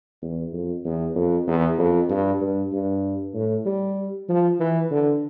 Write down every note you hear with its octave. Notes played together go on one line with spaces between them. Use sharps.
E2
F2
E2
F2
E2
F2
G2
G2
G2
A2
G3
F3
E3
D3